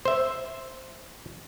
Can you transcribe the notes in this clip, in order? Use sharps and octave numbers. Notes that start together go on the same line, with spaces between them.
C5 E5